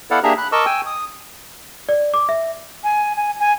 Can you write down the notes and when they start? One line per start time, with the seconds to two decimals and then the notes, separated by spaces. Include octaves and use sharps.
0.11 B3 E4 A4 D5 F5 F#5
0.23 A#3 D4 G4 G#4 E5 A#5
0.38 B5 F#6
0.52 A#4 D#5 A5 C#6 D6 E6
0.66 G5 G#5 E6
0.86 D#6
1.89 D5
2.14 D6
2.29 E5
2.84 G#5
3.16 G#5
3.40 G#5